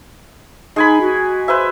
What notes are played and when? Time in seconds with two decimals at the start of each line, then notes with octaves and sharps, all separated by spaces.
0.76 G#3 D#4 G#5 B5
1.01 F#4
1.48 B4 C5 E5